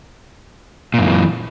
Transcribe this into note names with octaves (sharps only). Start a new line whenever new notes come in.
F#2 A#2 D#3 E3